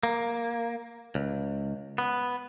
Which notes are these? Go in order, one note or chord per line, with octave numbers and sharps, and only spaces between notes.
A#3
C#2
B3